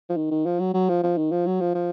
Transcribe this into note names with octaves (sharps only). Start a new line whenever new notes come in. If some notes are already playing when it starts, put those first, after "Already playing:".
F3
D#3
D#3
F3
F#3
F#3
F3
F3
D#3
F3
F#3
F3
F3